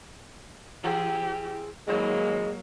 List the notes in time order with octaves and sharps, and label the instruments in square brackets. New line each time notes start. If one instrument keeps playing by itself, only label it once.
[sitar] E3 C4 G#4 [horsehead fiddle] G4
[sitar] D#2 C#3 C5 [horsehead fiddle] F#3 A#3 [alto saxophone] G#3